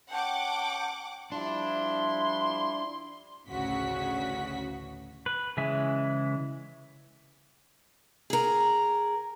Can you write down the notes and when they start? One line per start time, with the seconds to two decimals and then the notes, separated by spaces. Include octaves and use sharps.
0.11 C#4 F#5 G5 A5 D6
1.32 F3 G3 D4 E4 C6
3.48 A1 D2 C#3 F#4 B6
5.26 B4
5.57 C#3 E3 G#3 E5 G#5
8.30 G#4 A#4